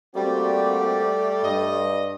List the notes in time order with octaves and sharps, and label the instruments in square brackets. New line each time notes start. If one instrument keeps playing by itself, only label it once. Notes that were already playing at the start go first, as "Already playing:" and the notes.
[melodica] G3 [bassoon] A3 [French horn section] A#3 C4 F#4 [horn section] G4 D5
[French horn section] G2 [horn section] D#5